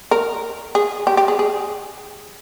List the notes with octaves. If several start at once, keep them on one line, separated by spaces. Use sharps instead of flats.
A#4
G#4
G4
G4
G#4
G#4